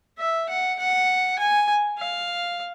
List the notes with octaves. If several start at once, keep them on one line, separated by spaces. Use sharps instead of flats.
E5
F#5
F#5
G#5
F5